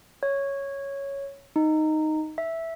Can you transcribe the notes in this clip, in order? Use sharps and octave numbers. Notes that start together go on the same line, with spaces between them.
C#5
D#4
E5